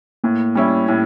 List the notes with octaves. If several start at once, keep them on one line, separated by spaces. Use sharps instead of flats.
A2 A#3
G3 C#4 E4
A2